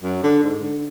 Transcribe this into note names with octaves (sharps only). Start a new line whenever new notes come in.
F#2
D3
G#2
D3